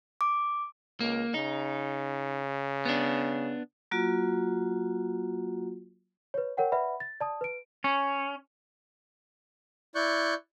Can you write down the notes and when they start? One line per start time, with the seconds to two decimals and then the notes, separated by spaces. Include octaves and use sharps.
0.21 D6
1.00 C#2 A#3
1.34 C#3 D#4
2.85 B3 D4
3.91 F#3 A#3 F4 F#4
6.34 B4 C#5
6.57 A#4 C#5 F#5 G5
6.72 B4 D5 E5 F#5 B5
7.00 A6
7.20 D5 A5 D#6
7.41 B4 D7
7.84 C#4
9.95 E4 D5 C#6 F#6 G6